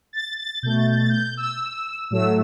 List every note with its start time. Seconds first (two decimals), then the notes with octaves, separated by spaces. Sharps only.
0.13 A6
0.37 A6
0.63 B2 A3 G6
0.74 A6
0.86 G6
0.97 A6
1.09 G6
1.37 E6
2.10 A2 F#3 A3 E6